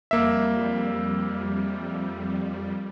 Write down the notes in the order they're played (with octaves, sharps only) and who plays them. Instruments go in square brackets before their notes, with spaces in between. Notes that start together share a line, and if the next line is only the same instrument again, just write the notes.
[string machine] F2 G3 [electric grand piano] A#3 E5